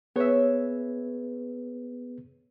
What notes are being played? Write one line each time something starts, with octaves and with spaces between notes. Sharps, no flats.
B3 G#4 B4 C#5 E5